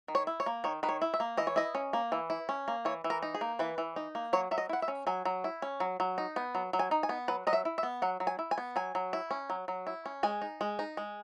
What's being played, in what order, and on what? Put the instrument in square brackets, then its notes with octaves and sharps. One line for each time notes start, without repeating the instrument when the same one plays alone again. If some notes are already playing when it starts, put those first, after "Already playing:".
[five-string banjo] D#3
C#5
E4
C#5
A#3
D#3 C#5
D#3 B4
C#5
E4
E5
A#3
E3 D#5
C#5
E4 D#5
C#4
A#3
E3
E4
C#4
A#3
E3 C#5
E3
A#4
D#4
G#4
A#3
E3 B4
E3
D#4
A#3
F#3 C#5
F#3 E5
D#5
E4 F#5
E5
C#4
F#3 G#5
F#3
E4
C#4
F#3
F#3
D#4
B3
F#3
F#3
G#5
D#4
G#5
B3
F#3 B4
F#3 D#5
E5
E4
E5
B3
F#3 F#5
F#3
G#5
E4
G#5
B3
F#3 G#5
F#3
E4
C#4
F#3
F#3
E4
C#4
G#3 G#5
D#4
G#3
D#4
G#3